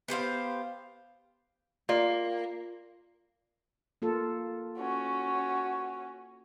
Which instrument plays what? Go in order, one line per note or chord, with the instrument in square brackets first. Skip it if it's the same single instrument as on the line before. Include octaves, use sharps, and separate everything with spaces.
[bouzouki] B3 G4 C5 F5
[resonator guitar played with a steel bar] A#3 [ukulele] F4 D5
[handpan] A#3 F4 A4
[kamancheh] C#4 F#4